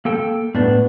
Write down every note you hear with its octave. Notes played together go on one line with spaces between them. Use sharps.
A#3 A4 G5
A2 B3 D4